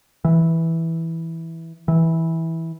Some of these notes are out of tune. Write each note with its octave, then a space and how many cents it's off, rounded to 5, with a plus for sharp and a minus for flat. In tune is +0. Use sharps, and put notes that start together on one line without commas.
E3 -5
E3 -15